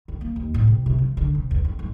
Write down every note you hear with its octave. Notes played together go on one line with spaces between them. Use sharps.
D#3
A#3
D#2
A2
C3
C3
F3
D3
C3
E2
F2
G#2